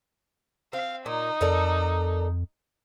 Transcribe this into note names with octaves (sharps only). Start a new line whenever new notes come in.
C4 F5
A#2 D#4
F2 A4 A#4 D5